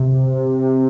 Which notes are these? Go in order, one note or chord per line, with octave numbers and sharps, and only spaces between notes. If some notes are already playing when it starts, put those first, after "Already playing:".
Already playing: C3